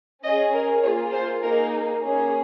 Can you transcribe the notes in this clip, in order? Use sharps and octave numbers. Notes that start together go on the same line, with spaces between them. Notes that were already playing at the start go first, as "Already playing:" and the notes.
C#4 G#4 D#5
A#4
A#3 F4 G#4 C#5
C5
A#3 D#4 G#4 A#4
A#3 C#4 G#4